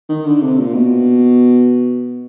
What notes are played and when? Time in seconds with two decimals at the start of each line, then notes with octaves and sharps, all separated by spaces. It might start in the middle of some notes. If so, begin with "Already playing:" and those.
0.09 D#3
0.25 D3
0.43 C3
0.59 A#2
0.75 B2